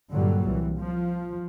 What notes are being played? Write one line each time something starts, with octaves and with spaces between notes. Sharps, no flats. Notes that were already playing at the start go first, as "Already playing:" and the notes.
G2 A#2 D3 F#3 G3
C2 E3
F3